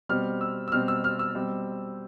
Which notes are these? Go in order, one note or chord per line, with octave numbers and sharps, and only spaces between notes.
B2 G3 C4 F6
E6
E6
B2 G3 C4 F6
E6
F6
E6
B2 G3 C4